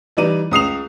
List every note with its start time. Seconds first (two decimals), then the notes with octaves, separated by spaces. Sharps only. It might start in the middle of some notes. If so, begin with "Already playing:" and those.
0.17 E3 G3 D#4 D5 D#7
0.51 C#2 D#6 C7 F7